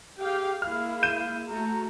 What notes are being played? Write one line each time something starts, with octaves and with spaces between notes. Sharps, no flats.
G4 G#4 F5 G5
G#3 A#3 E4 F5 F6
G6 D#7 E7
A3 F#4 A#5